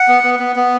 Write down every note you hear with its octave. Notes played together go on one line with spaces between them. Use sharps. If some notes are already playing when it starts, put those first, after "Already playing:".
Already playing: F#5
B3
B3
B3
B3